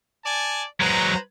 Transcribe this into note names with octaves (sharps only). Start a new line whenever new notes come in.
D5 G#5 A5
F#3 G#3 B4 C5 A#5